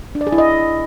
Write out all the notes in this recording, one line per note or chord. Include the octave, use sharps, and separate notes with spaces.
D4
D5
G#4
E4
D#5